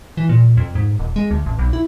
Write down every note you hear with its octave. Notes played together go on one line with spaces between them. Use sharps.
E3
A#2
F2
G#2
D#1
G#3
D2
A1
B1
E4